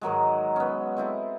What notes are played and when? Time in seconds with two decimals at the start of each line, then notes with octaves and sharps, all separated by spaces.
0.01 G#2 D#3 F#3 G#3
0.56 B3 C#4
0.97 G#3 C4 E4 A4